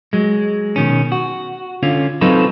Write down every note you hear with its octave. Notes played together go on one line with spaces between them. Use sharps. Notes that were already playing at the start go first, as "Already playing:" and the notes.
F#3 G#3
B2 D#3 C#4
F#4
D3 C#4 F4
F#3 C4 D#4 F4 A4 B4